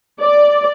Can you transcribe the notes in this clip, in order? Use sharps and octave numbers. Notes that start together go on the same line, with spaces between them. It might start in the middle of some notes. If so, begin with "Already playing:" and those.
D5